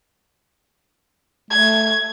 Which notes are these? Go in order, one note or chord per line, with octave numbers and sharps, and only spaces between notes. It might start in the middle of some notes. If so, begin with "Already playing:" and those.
A3 G#6